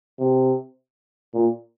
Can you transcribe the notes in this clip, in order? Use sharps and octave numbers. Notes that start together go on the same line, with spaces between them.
C3
A#2